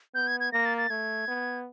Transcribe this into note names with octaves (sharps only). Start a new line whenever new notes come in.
B3 G6
G#6
G#6
A#3 A#6
A6
A6
A3 G#6
B3